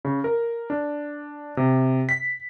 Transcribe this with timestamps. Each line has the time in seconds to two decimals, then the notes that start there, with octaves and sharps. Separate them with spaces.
0.05 C#3
0.24 A#4
0.70 D4
1.57 C3
2.09 B6